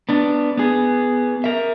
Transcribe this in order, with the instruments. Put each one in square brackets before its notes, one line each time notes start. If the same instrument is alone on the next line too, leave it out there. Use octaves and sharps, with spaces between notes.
[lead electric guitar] B3 D4
B3 G#4
A#4 E5